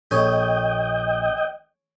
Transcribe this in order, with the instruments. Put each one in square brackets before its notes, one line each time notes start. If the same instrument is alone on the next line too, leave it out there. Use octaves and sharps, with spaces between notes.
[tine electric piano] A#1 [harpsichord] G#4 A4 C#5 [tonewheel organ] D#5 G5